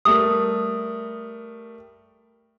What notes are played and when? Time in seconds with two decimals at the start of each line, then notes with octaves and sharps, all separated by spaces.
0.05 G3 A3 A#4 D#6